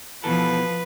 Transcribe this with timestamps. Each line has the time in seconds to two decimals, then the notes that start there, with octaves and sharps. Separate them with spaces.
0.24 B2 E3 F3 A4 B4